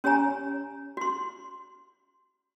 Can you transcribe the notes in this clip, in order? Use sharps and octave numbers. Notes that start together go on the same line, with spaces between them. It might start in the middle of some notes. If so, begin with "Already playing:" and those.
C#4 G4 C#5 G#5 A#5
F#4 C6